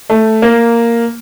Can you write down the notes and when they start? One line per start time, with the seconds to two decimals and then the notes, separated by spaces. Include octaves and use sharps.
0.10 A3
0.42 A#3